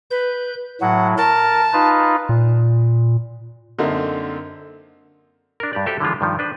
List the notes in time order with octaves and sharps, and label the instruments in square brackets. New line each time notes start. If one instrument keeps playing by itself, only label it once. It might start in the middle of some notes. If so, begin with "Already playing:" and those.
[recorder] B4 [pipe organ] G6
[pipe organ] A2 F#3 [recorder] F#5
[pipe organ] A#4 [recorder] A5
[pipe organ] D#4 F4 B4
[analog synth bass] A#2
[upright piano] F#2 D3 A#3 C4 D#4
[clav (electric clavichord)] D4 A#4
G2 G4 D5
F#4 G4 A4 C5 E5
D3 E3 F3 G#3 F4
G2 D#3 F3
D4 B4 C5